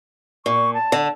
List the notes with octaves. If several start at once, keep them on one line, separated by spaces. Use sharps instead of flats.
A#2 C#6
A5
D3